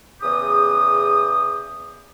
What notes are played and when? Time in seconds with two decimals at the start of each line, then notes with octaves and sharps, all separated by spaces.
0.21 E2 C#3 G4 D#6